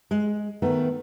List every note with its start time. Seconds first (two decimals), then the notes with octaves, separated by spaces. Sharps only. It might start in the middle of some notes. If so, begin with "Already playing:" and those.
0.11 G#3
0.62 D#3 A3 B3